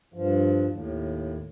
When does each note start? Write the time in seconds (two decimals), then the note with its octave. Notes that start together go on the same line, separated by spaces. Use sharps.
0.14 G2 F3
0.68 D#2 A2